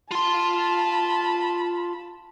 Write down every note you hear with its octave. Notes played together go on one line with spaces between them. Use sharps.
F4 A5 B5 C6